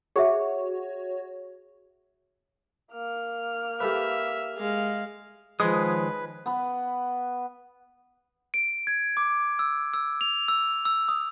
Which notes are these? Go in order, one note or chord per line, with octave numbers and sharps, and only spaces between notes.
F#4 G#4 C#5 E5
A#3 F6
G4 A4 B4 E5
G#3 F5
D#3 F3 G#3 B4 C#5 D#6
B3 B4
D7
G#6
D6
E6
E6
F7
E6
E6
D#6